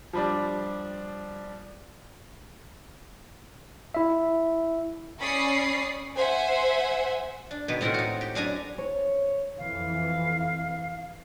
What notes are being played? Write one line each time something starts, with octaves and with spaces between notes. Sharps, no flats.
F3 G3 D4
E4 E5
C#4 D5 B5 C#6 D#6 C7
C5 E5 F#5 G#5
D4
B2 D#3 B4
A2 C4 F4 A#4 F#5
D#4 F#4
G4
F#2 D4 G#5 A#5
C#5
F2 E3 F5